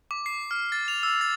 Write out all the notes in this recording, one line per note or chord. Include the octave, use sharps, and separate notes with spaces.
D6
C7
F6
A6
F7
E6
A6